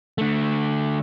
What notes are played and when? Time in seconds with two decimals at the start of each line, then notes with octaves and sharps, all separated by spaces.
0.18 D3 A3